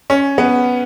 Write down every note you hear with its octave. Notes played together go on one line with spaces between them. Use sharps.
C#4
B3